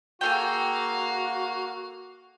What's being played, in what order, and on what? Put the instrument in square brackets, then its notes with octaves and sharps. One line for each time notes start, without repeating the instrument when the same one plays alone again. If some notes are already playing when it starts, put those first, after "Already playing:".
[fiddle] A#3 F5 [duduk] F#4 [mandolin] G#4 A4 G5